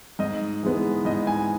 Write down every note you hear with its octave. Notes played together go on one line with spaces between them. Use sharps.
G#2 D#5
E3 G#3 B3
G#2 D#5
G#5